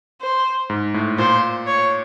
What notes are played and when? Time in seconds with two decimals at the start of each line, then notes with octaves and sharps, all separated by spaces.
0.21 C5
0.70 G#2
0.94 A2
1.18 A#2 C5
1.67 C#5